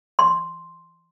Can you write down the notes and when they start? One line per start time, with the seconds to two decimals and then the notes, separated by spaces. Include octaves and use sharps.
0.19 C6